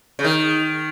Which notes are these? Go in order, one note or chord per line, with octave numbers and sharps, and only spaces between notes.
C#3
D#3